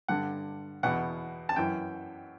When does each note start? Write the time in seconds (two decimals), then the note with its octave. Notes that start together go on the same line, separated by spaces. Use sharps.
0.08 G2 D3 F#5
0.83 E2 B2 F#5
1.49 A5
1.56 F#2 E3 G5